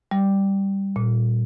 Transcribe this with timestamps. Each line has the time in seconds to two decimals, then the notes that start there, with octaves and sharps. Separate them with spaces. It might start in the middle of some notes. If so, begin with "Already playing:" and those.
0.11 G3
0.96 A#2